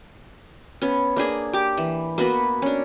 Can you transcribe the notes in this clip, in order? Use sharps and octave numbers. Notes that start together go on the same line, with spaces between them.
B3 C#4
A#3 D4 G#4 G#5
G4 D6
E3
A#3 B3 F#4 B4
C#4 D4